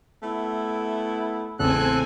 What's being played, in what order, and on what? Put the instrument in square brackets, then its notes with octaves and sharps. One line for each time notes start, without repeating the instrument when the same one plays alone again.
[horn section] A3 B3 E4
[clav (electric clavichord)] A1 E2 C#3 [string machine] C4 G#5 [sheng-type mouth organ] A4 F#6